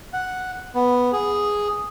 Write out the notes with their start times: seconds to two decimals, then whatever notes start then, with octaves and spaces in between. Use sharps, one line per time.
0.13 F#5
0.75 B3
1.13 G#4